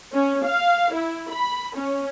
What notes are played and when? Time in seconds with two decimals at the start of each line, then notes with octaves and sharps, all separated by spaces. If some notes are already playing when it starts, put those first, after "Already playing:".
0.11 C#4
0.44 F5
0.93 E4
1.30 B5
1.75 C#4